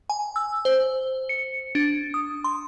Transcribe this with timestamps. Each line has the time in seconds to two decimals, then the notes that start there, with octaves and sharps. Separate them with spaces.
0.10 G#5
0.36 E6
0.65 C5
1.29 C#7
1.75 D4
2.14 D#6
2.44 C6